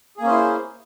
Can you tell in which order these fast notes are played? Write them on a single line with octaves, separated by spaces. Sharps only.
G#4 A#3 C#4 C5 E4